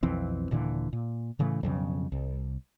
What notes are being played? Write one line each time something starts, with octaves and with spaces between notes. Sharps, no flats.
B1 F2 E3 C4
D#1 A#2 D3 E3
A#2
A2 C#3 E3 A3
B1 F2 C#3
C2